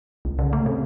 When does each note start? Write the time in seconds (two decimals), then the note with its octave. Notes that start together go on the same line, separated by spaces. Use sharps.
0.25 C2
0.39 C#3
0.53 A3
0.66 C3